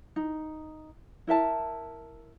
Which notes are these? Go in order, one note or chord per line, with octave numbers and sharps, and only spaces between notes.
D#4
E4 A#4 E5 A5